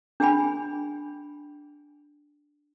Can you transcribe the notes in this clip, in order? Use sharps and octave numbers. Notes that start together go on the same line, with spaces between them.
D4 G#4 G5 G#5 B5